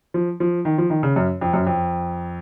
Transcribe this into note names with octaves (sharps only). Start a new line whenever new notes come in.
F3
F3
D#3
F3
D#3
C#3
F#2
F2
F#2
F2